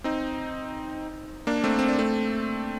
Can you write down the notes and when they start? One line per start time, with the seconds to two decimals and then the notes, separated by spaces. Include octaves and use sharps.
0.04 C4 D#4
1.47 A#3 D4
1.64 A3 C4
1.79 C4
1.89 D4
1.99 A3 C4